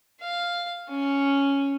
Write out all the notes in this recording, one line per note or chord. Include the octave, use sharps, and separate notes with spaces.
F5
C#4